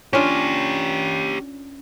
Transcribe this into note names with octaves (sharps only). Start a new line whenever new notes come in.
C#4 D4 F4 G4 C#5